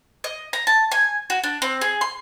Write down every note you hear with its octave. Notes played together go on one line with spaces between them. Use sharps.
D#5
A#5
A5
G#5
F#4
D4
C4
G#4
C6